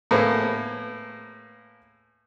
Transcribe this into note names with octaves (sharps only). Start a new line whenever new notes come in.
A2 A#3 B3 G#4